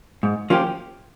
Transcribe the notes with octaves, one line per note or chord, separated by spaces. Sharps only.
G#2
F3 A#3 C#4 G4